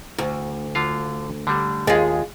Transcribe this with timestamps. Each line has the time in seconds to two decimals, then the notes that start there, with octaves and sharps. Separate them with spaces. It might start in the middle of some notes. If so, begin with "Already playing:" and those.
0.18 D2
0.75 D3 F4 F5
1.47 D3 G3
1.87 D#2 G#3 F4 G#4